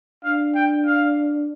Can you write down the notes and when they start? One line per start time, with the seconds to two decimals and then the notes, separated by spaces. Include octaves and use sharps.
0.24 D4 F5
0.55 G5
0.85 F5